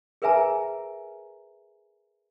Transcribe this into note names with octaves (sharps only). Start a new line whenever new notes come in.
G#4 A#4 B4 E5 G#5 A#5